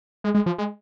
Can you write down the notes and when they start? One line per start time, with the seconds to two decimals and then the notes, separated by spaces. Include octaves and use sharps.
0.24 G#3
0.35 G#3
0.46 F3
0.58 G#3